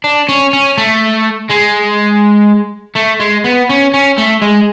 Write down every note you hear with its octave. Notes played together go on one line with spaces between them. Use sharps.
D4
C#4
C#4
A3
G#3
A3
G#3
B3
C#4
C#4
A3
G#3